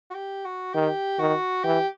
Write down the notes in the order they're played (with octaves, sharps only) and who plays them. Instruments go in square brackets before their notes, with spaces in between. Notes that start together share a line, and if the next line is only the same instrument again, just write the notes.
[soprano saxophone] F#4
G4
F#4
[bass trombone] D#3 [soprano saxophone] G4
[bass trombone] D#3 [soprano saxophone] F#4
[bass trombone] E3 [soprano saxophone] G4